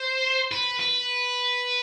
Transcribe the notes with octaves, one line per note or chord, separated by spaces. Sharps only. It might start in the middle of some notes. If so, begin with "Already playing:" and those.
Already playing: C5
B4
B4